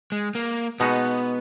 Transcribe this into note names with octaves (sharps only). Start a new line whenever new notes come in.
G#3
A#3
B2 G#3 B3 D#4 F#4